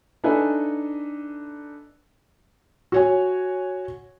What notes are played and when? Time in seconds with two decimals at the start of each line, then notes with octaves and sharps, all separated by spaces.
0.24 D4 D#4 A4 B4 E5 G#5
2.92 F#4 C#5 G#5